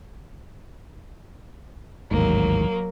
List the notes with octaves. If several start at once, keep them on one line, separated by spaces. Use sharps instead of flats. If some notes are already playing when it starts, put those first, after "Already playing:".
A1 D#2 G#2 F#3 A#3